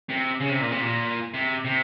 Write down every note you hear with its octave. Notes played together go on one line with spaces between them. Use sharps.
C3
C#3
C3
A#2
C3
A#2
C3
C3